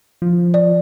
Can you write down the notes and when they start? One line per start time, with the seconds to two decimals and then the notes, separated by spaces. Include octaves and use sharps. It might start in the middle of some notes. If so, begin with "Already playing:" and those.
0.22 F3
0.54 D5